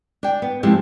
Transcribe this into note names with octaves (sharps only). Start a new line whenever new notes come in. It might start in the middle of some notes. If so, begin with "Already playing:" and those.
D4 G5
B3
F3 G#3 A3 C4 E4 G4